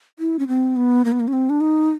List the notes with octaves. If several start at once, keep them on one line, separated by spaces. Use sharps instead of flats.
E4
C#4
C4
B3
A#3
B3
A#3
C#4
C4
D4
D#4